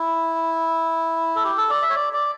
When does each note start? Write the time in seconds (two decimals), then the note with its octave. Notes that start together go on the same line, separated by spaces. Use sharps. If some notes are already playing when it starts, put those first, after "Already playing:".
Already playing: E4
1.36 A4
1.44 G4
1.57 A4
1.70 D5
1.82 E5
1.89 C#5
1.95 D5
2.13 D5